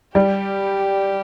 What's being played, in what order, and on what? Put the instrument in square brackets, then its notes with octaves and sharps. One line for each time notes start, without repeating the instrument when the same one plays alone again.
[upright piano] G3 [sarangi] G4